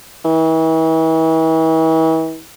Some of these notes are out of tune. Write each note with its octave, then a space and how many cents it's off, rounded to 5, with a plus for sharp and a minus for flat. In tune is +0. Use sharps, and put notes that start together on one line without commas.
E3 -40